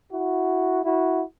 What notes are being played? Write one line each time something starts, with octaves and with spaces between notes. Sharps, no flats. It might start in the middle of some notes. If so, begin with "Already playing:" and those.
E4 F#4
E4 F#4